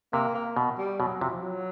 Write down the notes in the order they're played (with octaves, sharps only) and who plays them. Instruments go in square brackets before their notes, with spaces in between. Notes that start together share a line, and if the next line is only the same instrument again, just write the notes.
[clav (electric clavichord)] C3 [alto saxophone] A#3
[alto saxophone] A#3
[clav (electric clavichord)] B2
[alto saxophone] G3
[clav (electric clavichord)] B2 [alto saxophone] F#3
[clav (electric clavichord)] C3 [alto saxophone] F3
[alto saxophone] F3
F#3